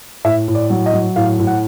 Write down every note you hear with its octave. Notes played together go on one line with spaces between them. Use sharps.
A2 E5
A2
D5
F#3
D#5
F#3
A2 F5
A2
F#5